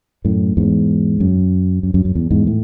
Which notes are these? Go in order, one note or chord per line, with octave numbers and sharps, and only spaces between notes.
F#2 A2
E2 G#2
F#2
F#2
F#2
F#2
E2
E2 G#2
A2